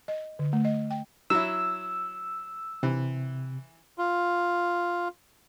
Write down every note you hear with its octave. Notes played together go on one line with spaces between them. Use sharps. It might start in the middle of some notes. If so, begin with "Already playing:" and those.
D#5
D3
A3
D#5
G5
F#3 E4 E6
C3 E3
F4